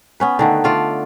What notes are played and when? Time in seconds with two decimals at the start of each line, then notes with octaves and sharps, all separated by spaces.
0.20 B3 C#4 B4
0.39 D3 D#3 A3
0.64 A3 F4 D5 F5